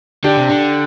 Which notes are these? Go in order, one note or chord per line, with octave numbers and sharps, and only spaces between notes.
D3 D4 G4
C3
D3